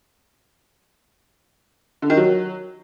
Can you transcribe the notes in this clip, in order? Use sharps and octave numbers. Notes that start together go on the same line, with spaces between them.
D3
D#3
F#3